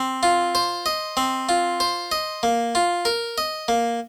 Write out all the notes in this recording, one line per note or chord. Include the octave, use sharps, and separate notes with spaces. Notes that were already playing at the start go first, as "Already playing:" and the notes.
Already playing: C4
F4
C5
D#5
C4
F4
C5
D#5
A#3
F4
A#4
D#5
A#3